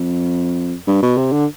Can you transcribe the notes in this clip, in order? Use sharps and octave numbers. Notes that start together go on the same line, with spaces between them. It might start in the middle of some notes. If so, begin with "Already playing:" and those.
Already playing: F2
G2
B2
C3
D3